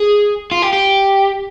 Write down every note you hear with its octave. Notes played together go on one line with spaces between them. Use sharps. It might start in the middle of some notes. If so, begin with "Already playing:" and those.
Already playing: G#4
F4
G4
G4